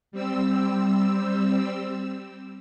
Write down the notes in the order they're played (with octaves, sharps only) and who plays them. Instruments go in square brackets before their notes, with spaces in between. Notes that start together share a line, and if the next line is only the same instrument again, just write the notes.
[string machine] G3 C4 E6